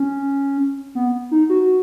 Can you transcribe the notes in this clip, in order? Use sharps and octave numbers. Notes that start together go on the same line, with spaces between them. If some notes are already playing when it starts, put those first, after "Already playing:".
Already playing: C#4
B3
D#4
F#4